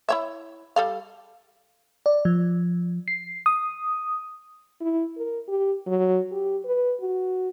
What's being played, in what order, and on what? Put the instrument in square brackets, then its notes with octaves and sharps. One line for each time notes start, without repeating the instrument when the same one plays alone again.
[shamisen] E4 C#5 E5
G3 A4 F5
[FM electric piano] D5
F3
C7
D#6
[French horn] E4
A#4
G4
F#3
G4
B4
F#4